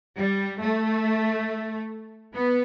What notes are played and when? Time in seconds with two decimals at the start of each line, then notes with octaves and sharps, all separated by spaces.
0.18 G3
0.62 A3
2.34 B3